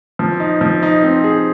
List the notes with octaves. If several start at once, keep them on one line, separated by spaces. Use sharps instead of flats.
F3
D#4
F3
D#4
C4
G#4